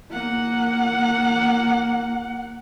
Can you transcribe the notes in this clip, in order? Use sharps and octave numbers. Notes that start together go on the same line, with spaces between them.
A#3 F#5